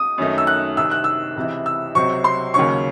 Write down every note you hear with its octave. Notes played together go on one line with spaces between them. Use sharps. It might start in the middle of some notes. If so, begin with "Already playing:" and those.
Already playing: D#6
F#2 D#3 A3 D#4
E6
F#6
C2 C3 D#3 E6
F#6
E6
C#2 C3 E3
E6
C#2 C3 F#3 C4 C#6
C6
D#2 C#3 F#3 C#4 C#6